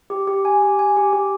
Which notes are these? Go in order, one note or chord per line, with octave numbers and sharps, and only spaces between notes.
G4
G4
G#5
G4
G#5
G4
G4